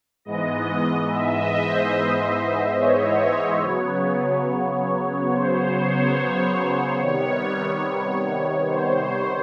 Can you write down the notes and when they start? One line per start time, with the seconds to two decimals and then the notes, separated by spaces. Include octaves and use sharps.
0.25 G#2 E3 G#3 B3 D#5
1.09 E5
1.37 D#5
1.66 C5
1.94 C5
2.78 C#5
3.62 C#3 F#3 B3
5.31 C5
5.59 C5
5.87 C#5
7.00 C3 D#3 G3 B3 C#5
8.68 C5